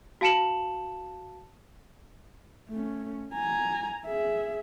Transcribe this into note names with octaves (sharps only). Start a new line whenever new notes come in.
F#4 F5 A5 C#7 E7 F#7
A3 C#4
G#5 A#5
G#4 E5